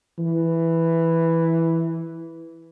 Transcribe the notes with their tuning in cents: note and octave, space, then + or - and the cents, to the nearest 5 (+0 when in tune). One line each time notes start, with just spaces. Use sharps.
E3 +0